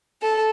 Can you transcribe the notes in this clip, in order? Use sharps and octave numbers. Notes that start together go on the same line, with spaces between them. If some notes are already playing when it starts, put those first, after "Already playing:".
A4